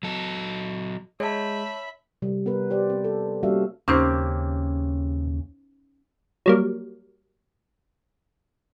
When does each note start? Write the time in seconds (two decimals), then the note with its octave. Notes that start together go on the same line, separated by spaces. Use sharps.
0.03 F#3 A4
1.20 G#3 C#5 E5 A5 B5
2.22 C3 G3
2.46 B3 A#4 B4
2.70 G4 C5 D5
2.90 C4
3.04 A4
3.43 G3 A#3 C#4 F#4 E5 F5
3.88 D#2 C#3 A#3 C4 C#4 D#4 G4 C5
6.46 F#3 G3 A#3